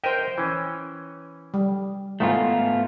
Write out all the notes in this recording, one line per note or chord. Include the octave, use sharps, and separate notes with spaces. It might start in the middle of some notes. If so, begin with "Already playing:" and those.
A#4 C5 D#5 E5 G5
E3 C#4
G3
G#2 D#3 A3 B3 F4